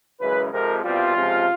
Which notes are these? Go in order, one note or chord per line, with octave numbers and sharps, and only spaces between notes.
F#2 C#3 E3 G#3 B4
F2 C3 F3 G#3 A#4
C2 B2 G3 C4 F4
C#2 C3 F3 G#3